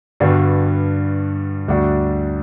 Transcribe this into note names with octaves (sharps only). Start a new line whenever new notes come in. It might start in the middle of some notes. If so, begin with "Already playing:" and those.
G2 D3 G3 B3 F#4
D2 D3 G3 D4 F#4